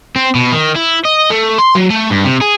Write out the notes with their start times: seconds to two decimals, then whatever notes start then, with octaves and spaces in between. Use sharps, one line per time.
0.16 C4
0.35 B2
0.52 D#3
0.75 E4
1.05 D#5
1.30 A3
1.58 C6
1.75 F#3
1.90 A3
2.10 G2
2.25 C3
2.41 G#4